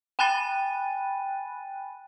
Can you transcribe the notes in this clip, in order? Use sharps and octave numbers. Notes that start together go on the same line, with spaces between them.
G5 G#5 B5 F#6 A6 D#7